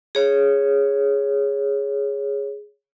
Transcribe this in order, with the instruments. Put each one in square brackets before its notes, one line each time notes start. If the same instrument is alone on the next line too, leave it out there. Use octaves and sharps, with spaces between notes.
[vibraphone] G#4 C#5